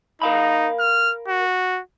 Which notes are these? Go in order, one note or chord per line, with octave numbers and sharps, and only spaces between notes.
D#4 A#4 F5 B5
F6
F#4